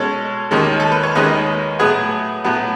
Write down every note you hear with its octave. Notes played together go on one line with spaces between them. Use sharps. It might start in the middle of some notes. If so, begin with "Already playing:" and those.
Already playing: B2 G#3 C#4 A4 C#5
D#2 D#3 G#3 C#4
A4
B4
C#5
D#2 D#3 G#3 C#4 B4 D#5
A2 F#3 B3 G#4 B4
A2 F#3 B3